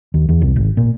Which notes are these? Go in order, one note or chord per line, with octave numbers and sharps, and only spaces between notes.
D#2
E2
C2
G#1
A#2